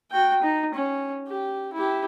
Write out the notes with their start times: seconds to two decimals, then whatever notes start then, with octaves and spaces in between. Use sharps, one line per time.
0.11 F#4 G5
0.42 D#4
0.74 C#4
1.28 G4
1.73 E4 G4